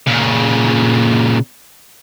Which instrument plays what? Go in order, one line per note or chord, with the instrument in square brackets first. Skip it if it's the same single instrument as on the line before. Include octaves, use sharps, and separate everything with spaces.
[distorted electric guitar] A#2 C#3